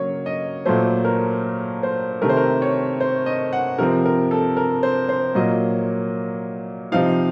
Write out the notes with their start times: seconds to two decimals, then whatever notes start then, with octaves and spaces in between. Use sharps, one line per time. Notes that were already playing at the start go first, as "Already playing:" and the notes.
Already playing: C#3 F#3 A#3 C#5
0.26 D#5
0.66 A#2 F#3 A3 C5
1.05 A#4
1.83 C5
2.22 C3 D#3 A3 A#4
2.29 C5
2.37 A#4
2.62 C#5
3.00 C5
3.26 D#5
3.53 F#5
3.78 C3 F3 C4 A#4
4.05 A#4
4.31 A4
4.57 A#4
4.83 C5
5.09 C5
5.35 A#2 F#3 A#3 D#5
6.92 C3 F3 C4 D#4 F5